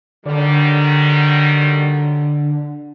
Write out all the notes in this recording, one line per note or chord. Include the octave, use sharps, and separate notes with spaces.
D3 D#3 F#3 G3